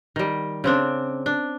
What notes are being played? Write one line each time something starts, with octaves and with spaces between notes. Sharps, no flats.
D#3 G3
C#3 C4 D4
D4